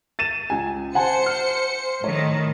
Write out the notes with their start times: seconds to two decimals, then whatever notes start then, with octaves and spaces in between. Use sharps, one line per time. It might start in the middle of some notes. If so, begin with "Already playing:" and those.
0.19 A6 D#7 E7
0.50 C#2 G#5
0.95 C5 F#5 G#5 A5 C#7
1.26 F6
2.04 A2 D#3 C#5